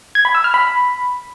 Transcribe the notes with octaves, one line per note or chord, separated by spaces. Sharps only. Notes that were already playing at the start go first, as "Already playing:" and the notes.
G#6
B5
E6
F6
B5